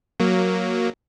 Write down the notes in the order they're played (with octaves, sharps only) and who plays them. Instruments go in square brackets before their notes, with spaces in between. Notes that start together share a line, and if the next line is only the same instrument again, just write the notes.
[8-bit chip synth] F#3 A#3